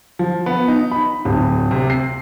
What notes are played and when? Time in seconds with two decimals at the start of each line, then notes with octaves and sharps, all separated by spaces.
0.19 F3
0.46 B3
0.68 D#4
0.91 B5
1.25 D1
1.71 C3
1.90 C7